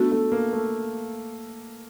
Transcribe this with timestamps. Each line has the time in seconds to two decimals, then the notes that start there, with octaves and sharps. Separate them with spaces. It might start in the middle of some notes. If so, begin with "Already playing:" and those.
Already playing: A3 B3 D4 F#4 A4
0.12 A3
0.32 A#3
0.53 A3